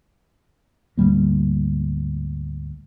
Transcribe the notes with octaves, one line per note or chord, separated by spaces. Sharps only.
D2 G#2 G3 A#3